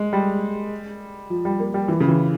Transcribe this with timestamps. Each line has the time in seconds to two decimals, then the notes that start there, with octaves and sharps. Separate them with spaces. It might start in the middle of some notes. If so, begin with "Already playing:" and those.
Already playing: G#3
0.13 G3
1.30 F3
1.45 G3
1.60 A#3
1.74 G3
1.88 E3
2.00 C#3
2.08 E3